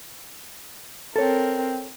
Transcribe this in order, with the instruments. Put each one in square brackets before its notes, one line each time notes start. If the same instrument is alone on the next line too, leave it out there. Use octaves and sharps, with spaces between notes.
[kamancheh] C4 A#4 [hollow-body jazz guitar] A4 C#5